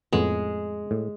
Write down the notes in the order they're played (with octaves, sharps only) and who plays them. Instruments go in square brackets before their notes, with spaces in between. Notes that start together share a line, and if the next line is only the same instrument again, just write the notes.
[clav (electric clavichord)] F2 A2 B3 [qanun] G#3
[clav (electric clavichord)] A2